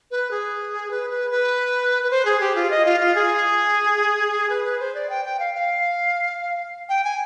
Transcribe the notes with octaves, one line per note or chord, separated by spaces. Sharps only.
B4
G#4
B4
B4
B4
B4
C5
G#4
G4
F4
D#5
F4
F4
G#4
B4
B4
C5
D5
G5
G5
F5
F5
G5
G#5